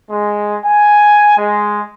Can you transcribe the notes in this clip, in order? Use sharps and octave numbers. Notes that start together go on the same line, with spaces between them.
G#3
G#5
G#3